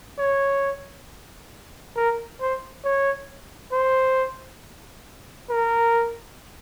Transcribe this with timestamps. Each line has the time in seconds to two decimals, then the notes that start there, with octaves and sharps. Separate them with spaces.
0.19 C#5
1.96 A#4
2.40 C5
2.84 C#5
3.73 C5
5.50 A#4